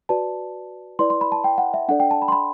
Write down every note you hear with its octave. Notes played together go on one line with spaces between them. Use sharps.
F#4 B4 D5 A5
E4 B4 D5 C6
C6
B5
A5
G5
F#5
E5
D4 A4 D5 F#5
G5
A5
B5
C6
B5